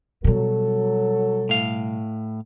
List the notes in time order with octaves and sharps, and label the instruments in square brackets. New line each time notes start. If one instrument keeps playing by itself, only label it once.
[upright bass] B2 G3 [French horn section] F#3 A4
[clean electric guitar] A2 F5